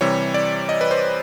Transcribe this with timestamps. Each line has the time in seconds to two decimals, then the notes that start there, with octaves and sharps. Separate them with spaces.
0.01 C3 E3 G3 C#5
0.34 D5
0.69 D#5
0.81 B4
0.91 C5